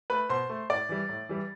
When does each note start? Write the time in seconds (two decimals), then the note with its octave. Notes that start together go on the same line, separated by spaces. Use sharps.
0.10 A3 B4 B5
0.29 B2 C5 C6
0.49 A3
0.70 A2 D5 D6
0.89 E3 G3
1.09 A2
1.29 E3 G3